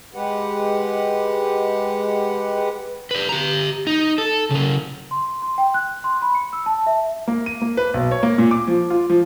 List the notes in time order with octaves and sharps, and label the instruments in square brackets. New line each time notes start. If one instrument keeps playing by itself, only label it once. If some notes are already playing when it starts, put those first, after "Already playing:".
[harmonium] G#3 G4 B4 F#5
[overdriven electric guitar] B4 D5
G4 A#5
D#4
A4
C#3 A#4
[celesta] C6
C6
G5
F#6
C6
B5
C#7
E6
A5
E5
[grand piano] A#3
D#7
A#3
B4
B1
C#5
A#3
A#2
D6
F3
F4
F3